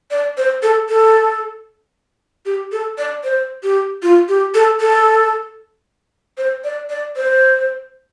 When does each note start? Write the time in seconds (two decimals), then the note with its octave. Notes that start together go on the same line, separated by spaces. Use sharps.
0.11 D5
0.37 C5
0.63 A4
0.89 A4
2.46 G4
2.72 A4
2.98 D5
3.24 C5
3.63 G4
4.03 F4
4.29 G4
4.55 A4
4.81 A4
6.38 C5
6.64 D5
6.90 D5
7.16 C5